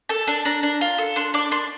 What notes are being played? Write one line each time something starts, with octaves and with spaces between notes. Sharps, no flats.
A4 A5
D4 A5
D4 A#5
D4
F4
A4
D4 C6
D4 D6
D4 C6